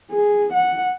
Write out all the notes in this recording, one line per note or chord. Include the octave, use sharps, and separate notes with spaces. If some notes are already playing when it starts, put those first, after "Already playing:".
G#4
F#5